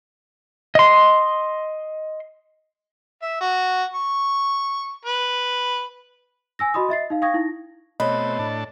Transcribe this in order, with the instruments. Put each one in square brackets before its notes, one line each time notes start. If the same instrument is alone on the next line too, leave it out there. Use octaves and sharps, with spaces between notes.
[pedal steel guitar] D#5 C6
[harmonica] E5
F#4
C#6
B4
[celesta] G#5 E6 A#6
F#4 D#5 B5 C6 D#6
D#5 E5 A6 C7
D#4 F5
F5 G5 C#6 D#6 G#6 A#6
D#4 E4 A#6
[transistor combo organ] B2 A3 C4 [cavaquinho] B4 [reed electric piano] C#5 D#5
[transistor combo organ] A2 D4 A5